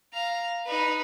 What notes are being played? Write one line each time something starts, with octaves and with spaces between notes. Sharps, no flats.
F5 A#5
D#4 B4